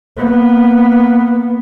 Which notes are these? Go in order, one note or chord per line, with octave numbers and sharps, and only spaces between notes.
A#3 B3